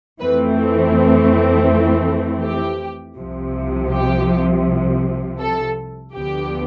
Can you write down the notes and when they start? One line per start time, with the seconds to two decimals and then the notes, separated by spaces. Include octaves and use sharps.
0.20 F2 E3 A3 C4 B4
2.42 G4
3.18 C2 C3 F3
3.91 G4
5.40 A4
6.14 D2 D3 F3 B3 G4